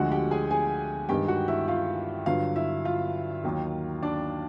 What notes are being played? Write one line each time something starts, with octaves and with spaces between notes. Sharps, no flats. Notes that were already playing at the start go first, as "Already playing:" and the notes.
Already playing: D2 D3 F3 G#3 F#4 F#5
G4 G5
G#4 G#5
G#4 G#5
G2 D#3 G#3 G4 G5
F#4 F#5
E4 E5
F4 F5
G2 D3 F#3 F4 F5
E4 E5
F4 F5
D#2 D#3 F#3
D4 D5